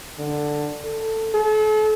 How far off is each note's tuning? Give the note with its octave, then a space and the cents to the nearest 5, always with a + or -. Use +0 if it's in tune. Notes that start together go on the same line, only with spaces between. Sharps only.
D3 +10
A4 +15
A4 -40